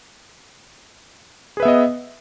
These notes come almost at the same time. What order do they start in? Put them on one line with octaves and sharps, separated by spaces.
G#4 B4 E5 B3 D#5